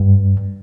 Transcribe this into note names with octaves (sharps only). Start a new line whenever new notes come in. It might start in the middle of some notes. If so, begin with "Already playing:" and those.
Already playing: G2